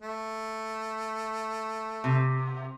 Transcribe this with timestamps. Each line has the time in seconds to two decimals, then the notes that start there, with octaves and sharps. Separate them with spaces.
0.01 A3
2.04 C3